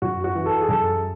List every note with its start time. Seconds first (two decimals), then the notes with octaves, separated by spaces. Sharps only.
0.02 F#2 F#4
0.24 F#4
0.35 E3
0.46 A4
0.62 G#4
0.68 F#2 A4